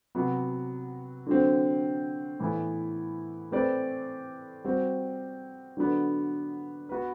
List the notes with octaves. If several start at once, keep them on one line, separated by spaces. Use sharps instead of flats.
C3 F#3 B3 F#4
D3 F#3 C4
A2 E3 B3 E4
A3 C4 G4 B4 D5
G3 C4 F#4
D3 F#3 B3 D4
B3 F#4 B4